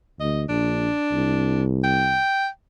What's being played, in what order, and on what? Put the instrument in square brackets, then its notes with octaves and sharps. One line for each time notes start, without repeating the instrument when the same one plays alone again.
[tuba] D2 [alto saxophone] D#5
[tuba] A#1 [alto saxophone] D4
[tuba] C2
[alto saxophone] G5